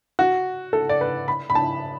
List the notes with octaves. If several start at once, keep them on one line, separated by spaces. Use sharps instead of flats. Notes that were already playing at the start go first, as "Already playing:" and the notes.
F#4
A4
D5
B4
B5
B5
A5